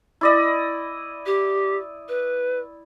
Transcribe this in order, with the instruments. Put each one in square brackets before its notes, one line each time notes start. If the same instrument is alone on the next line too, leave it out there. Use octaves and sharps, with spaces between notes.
[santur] E4 D5 D#5
[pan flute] G4
B4